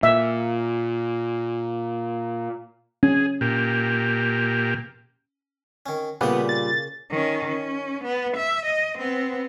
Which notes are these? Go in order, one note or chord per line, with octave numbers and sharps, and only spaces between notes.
A#2 E5
C#4 G#4
A#2 G4
D#3 C#4
A#2 C#3 G3 A#3 B3 G5
A6
D#3 C#4
C#4
B3
E5
D#5
B3 C4